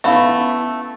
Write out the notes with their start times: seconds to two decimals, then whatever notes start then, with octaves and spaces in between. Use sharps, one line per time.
0.04 A3 B3 C#4 E4 E5 F5 B5